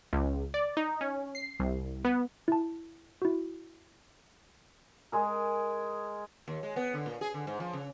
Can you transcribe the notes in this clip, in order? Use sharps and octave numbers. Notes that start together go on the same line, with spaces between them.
C#2
D5
D#4
C#4
C7
C2
B3
E4 A5
E4 F#4
G#3 G#4 A#4
D#2
G#3
B3
D3
A#2
G#4
D3
G#2
F3
C#3